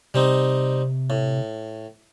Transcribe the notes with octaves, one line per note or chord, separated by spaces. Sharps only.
C3 G3 C4 D#4
A2